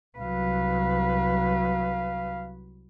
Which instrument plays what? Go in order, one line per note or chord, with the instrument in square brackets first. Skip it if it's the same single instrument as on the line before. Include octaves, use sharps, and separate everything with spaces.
[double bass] C2 F#3 [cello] B4 [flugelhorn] F5